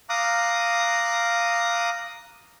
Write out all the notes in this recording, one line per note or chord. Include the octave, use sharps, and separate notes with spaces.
F5 A#5 D6 D#6 F#6